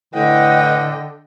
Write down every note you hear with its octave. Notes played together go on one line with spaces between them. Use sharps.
A2 D3 E3 D#5 F#5 G5